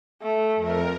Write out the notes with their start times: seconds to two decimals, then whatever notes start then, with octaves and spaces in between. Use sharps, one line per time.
0.22 A3
0.56 F2 A#4